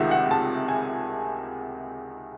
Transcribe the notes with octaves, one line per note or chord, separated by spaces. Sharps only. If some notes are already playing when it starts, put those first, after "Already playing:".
Already playing: C#2 C3 D#3 E5 F#5
F#5
A5
G#5